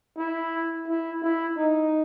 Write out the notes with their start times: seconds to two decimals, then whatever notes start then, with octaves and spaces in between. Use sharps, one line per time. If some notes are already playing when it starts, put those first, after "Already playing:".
0.18 E4
0.88 E4
1.23 E4
1.57 D#4